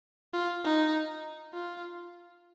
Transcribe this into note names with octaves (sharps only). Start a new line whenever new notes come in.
F4
D#4
F4